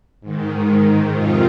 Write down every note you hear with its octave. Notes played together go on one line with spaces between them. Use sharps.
G#2 D#3
F2 C3 D#3 F4